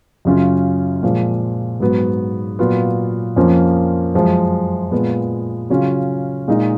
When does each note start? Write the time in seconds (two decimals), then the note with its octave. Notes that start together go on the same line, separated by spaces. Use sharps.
0.25 F#2 C#3 F#3 C#4 F4
1.03 A#2 F3 G#3
1.80 G#2 F#3 B3
2.59 A#2 F#3 B3 F4
3.36 F2 F3 A#3 C#4 F4
4.14 F#2 F3 G#3
4.92 A#2 G#3 B3 F4
5.70 C#3 F#3 C#4 F4
6.48 A#2 G#3 D#4